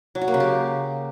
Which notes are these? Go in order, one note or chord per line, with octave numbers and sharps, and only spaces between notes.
F#3
F#4
A#3
C#3
G4